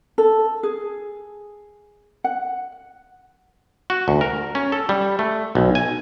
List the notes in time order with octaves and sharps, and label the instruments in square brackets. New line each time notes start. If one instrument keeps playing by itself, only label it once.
[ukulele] A4
G#4
F#5
[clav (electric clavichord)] F#4
D2
A#4
C#4
A4
G3
A3
B1
G#5